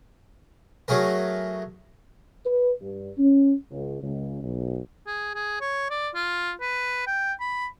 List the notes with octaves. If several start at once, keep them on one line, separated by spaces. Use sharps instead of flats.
F#3 A3 G#4 A#4
B4
G2
C#4
C#2
C#2
B1
G#4
G#4
C#5
D5
F4
B4
G5
B5